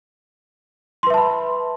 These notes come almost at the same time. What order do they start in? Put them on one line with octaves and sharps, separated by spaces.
C6 B4 E5 A5 B5